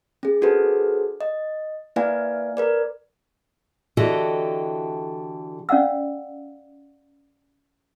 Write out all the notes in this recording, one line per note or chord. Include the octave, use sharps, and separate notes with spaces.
C#4 G#4
D4 F#4 G#4 A4 B4 C5
D#5
A#3 E4 B4 D5 F5 G#5
A#4 B4 D5
D3 E3 F#4 G4 A4 D#5
C#4 D5 F5 F#5 E6